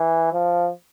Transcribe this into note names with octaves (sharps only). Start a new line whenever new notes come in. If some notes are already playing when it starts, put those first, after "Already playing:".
Already playing: E3
F3